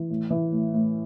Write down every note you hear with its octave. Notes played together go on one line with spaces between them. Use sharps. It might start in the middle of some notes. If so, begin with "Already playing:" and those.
Already playing: E3
A2
E3
A2
A2